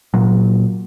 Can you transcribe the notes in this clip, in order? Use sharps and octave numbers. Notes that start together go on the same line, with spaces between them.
A#2 F#3